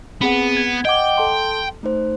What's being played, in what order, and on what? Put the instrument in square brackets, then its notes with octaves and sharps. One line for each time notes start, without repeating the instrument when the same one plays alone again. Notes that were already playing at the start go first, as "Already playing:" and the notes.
[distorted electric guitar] B3 [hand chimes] C4 G#4 F#5
[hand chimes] G#6
[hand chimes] D#5 F#5 D6 [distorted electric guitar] G5
[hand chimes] A4 A5 C6
A3 D#4 C5